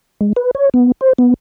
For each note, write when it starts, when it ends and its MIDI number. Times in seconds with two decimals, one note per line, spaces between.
0.21 0.33 56
0.36 0.51 71
0.55 0.69 73
0.74 0.92 59
1.01 1.13 72
1.18 1.34 59